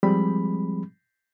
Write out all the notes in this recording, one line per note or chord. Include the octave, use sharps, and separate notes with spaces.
F3 G3 G#3 C4 G#4 B5